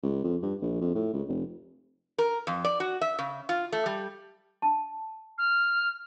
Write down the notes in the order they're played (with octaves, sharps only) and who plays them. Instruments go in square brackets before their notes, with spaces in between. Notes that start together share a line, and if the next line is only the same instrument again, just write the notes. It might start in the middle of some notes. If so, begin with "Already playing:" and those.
[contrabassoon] C#2
F2
G2
A#1
F2
A2
C#2
F1
[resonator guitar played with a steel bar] A#4
F2
D5
F#4
E5
C#3
F4
A3
G3
[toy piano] A5
[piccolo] F6